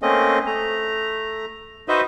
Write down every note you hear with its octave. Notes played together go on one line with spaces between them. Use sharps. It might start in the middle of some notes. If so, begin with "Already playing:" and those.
A3 A#3 C4 C#4 D#5
A3 A#5
D#4 F#4 B4 C5 D#5 E5